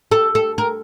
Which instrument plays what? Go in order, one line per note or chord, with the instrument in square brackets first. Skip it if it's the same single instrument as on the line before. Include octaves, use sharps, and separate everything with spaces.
[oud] A4
A4
A#4